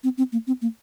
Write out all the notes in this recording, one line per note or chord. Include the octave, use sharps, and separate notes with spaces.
C4
C4
A#3
C4
A#3